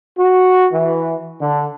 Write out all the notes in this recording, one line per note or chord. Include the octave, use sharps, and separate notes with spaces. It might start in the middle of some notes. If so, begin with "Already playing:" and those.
F#4
E3
D3